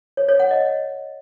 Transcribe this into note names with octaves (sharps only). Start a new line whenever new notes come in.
C#5
C#5
F#5
D#5